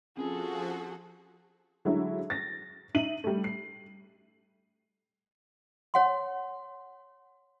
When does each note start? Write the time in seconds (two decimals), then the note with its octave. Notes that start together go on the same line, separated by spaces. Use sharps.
0.17 F3 C4 C#4 F4 F#4 G#4 A4
1.85 D3 F#3 G#3 E4 F#4
2.30 A6 A#6
2.94 D#4 E5 D#7 F#7
3.24 G3 A3
3.44 C7
5.94 C#5 F#5 C6